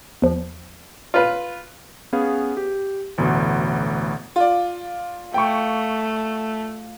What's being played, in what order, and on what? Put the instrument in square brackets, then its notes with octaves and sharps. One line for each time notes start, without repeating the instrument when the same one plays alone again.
[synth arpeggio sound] E2 F3
[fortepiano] F4 B4
[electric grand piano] B3 C#4 G#4 B4 F5
G4
A1 D2 B2
[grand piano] F4 D5
[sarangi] A3 [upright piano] G5 C#6